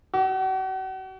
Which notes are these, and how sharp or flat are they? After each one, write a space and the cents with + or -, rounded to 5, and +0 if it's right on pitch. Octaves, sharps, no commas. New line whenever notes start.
F#4 +40